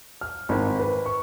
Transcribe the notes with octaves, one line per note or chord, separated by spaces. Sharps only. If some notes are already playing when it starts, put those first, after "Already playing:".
F6
G#1
B4
C#6